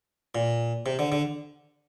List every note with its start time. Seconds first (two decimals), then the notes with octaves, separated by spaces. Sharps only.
0.35 A#2
0.86 C3
0.99 D3
1.12 D3